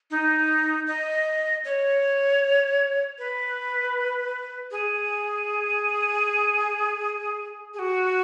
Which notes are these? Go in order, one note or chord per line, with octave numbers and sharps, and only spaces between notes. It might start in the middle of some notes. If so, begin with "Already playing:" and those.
D#4
D#5
C#5
B4
G#4
G#4
F#4